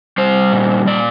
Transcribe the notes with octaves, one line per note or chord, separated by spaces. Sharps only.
G3 C5
A#2
A#2 D5